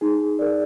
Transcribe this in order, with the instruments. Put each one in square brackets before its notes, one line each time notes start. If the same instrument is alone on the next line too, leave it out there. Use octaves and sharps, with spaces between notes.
[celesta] D#4 [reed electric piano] G#4
[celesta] A#4 D5